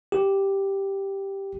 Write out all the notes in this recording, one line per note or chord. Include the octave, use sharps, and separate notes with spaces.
G4